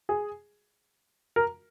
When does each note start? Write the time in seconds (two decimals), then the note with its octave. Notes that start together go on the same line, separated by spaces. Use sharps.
0.09 G#4
1.36 A#4